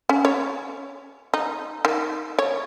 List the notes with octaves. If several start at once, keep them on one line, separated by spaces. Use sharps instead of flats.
C#4
C#5
D#4
D#3
C#5